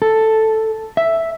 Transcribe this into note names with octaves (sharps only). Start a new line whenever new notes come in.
A4
E5